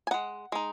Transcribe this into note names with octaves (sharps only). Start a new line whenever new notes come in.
G#5
G#3 D#4 F#5
G#3 D#4